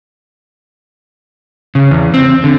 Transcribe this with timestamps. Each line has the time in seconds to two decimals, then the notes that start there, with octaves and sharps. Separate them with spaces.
1.75 C#3
1.91 E2
2.14 C4
2.44 D3